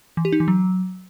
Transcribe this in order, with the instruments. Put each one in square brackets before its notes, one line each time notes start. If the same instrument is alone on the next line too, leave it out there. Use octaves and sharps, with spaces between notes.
[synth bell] E3
G4
D#4
E3
F#3